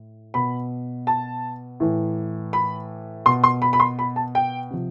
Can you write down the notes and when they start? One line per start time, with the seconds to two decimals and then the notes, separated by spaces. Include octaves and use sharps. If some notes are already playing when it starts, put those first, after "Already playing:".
Already playing: A2
0.34 B2 B5
1.07 A5
1.80 A2 E3
2.53 B5
3.26 B2 C6
3.44 C6
3.62 B5
3.73 B5
3.80 C6
3.99 B5
4.16 A5
4.35 G5
4.71 C3 F3